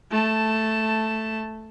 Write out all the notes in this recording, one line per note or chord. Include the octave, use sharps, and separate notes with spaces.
A3 A5